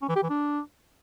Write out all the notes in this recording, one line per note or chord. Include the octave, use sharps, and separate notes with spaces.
C#4
E3
G4
E3
D4